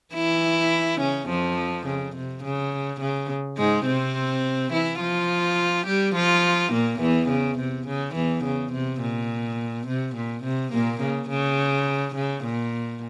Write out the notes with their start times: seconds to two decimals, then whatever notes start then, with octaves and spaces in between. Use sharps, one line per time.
0.14 E3 E4
1.00 C#3 C#4
1.29 F2 F3
1.87 C#3
2.15 C3
2.44 C#3
3.00 C#3
3.57 G#2 G#3
3.86 C3 C4
4.72 E3 E4
5.00 F3 F4
5.87 G3 G4
6.15 F3 F4
6.72 A#2 A#3
7.00 E2 E3
7.29 C#3
7.58 C3
7.87 C#3
8.15 E2 E3
8.44 C#3
8.72 C3
9.01 A#2
9.87 C3
10.16 A#2
10.44 C3
10.73 A#2 A#3
11.02 C#3
11.29 C#3
12.16 C#3
12.44 A#2